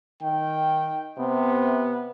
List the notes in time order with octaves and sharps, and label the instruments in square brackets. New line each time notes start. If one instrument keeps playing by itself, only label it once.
[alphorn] D#3 [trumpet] G5
[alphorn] C3 [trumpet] B3